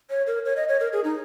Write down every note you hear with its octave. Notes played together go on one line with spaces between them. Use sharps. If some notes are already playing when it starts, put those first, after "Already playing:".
C#5
A#4
C#5
D#5
C#5
A#4
G#4
D#4